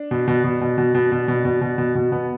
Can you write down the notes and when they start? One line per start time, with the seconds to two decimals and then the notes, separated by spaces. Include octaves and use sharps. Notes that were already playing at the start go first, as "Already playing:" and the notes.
Already playing: D4
0.11 B2
0.28 B2
0.44 B2
0.61 B2
0.78 B2
0.95 B2
1.12 B2
1.28 B2
1.45 B2
1.61 B2
1.78 B2
1.95 B2
2.12 B2 B3